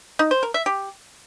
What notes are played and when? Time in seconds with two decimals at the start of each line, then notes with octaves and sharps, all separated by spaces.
0.19 D#4
0.31 C5
0.43 A#4
0.54 E5
0.66 G4